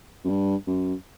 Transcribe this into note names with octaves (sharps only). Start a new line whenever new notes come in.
F#2
G2
F#2